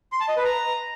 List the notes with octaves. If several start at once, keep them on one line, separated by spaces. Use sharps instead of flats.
C6
A5
D#5
B4
A#5